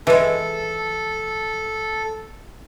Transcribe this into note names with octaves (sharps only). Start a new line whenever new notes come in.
E3 G#3 A4